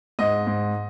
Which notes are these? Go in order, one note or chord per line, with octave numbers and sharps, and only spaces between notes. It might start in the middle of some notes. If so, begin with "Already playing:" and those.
G#2 D#5
G#2